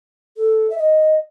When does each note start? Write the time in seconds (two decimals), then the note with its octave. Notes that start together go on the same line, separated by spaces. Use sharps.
0.37 A4
0.70 E5
0.78 D#5